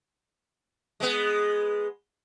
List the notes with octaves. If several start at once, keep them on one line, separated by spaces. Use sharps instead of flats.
G#3 B3